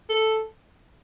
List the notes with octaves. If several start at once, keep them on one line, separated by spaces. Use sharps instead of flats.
A4